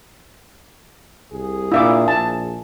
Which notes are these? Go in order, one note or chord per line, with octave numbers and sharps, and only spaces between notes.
C2 G#4
A#2 D4 E4 E5 F5 D6
A#1 G#5 A5